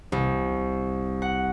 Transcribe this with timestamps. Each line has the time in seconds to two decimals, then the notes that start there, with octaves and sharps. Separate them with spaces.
0.12 C2
1.22 F#5